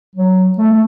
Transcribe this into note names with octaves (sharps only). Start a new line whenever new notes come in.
F#3
A3
A3